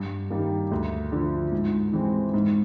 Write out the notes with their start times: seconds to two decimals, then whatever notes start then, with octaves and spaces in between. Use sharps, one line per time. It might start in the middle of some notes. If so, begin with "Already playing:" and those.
Already playing: G2
0.30 D#3 G3 A#3
0.71 D2
1.12 D3 F3
1.52 G#2
1.93 E3 G#3 C4
2.34 G#2